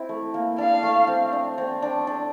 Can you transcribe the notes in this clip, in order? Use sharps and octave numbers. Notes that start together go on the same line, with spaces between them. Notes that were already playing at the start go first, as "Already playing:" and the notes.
Already playing: C4 E4
A3
A#3
D4 F5
A3
C4
D4
C4
D4
D4